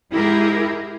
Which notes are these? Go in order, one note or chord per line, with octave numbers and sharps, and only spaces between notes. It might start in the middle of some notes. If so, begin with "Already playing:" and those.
G#2 E4 G4 G#4 A#4